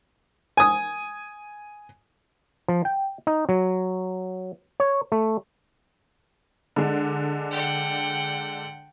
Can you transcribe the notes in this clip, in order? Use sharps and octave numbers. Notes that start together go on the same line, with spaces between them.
G#5 D#6
F3
G5
D#4
F#3
C#5
A3
D3 G#3 D4
F#5 G5